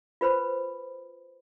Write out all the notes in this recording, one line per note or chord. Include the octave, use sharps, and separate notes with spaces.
F4 B4 C5 B5